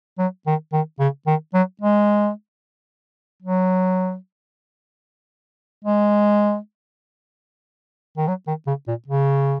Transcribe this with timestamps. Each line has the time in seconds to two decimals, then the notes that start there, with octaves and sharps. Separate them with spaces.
0.19 F#3
0.47 D#3
0.73 D#3
1.00 C#3
1.27 D#3
1.54 F#3
1.81 G#3
3.43 F#3
5.84 G#3
8.17 D#3
8.28 F#3
8.47 D#3
8.67 C#3
8.88 A#2
9.08 C#3